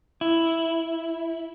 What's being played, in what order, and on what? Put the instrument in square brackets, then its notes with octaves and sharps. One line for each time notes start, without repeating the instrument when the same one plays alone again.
[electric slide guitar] E4